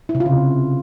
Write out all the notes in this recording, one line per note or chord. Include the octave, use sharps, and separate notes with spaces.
E4
C3
F4
C#3